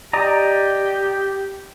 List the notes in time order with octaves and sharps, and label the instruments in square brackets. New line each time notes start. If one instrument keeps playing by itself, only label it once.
[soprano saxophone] G4 [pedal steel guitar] D5 D#5 A#5